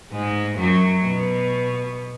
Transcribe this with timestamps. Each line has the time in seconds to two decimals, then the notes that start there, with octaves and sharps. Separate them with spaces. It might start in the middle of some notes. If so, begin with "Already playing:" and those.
0.11 G#2 G#3
0.59 F#2 F#3
1.06 B2